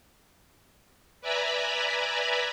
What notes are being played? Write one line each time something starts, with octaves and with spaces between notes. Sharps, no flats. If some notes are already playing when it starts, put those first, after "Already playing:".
B4 D5 E5 G#5 A#5 B5